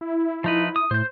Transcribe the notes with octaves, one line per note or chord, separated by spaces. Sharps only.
E4
F3 D#4 B4
D#6
A2 C5 G6